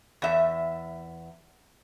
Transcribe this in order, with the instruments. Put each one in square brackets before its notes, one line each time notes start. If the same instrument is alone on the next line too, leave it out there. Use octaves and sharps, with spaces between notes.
[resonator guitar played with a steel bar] E2 E5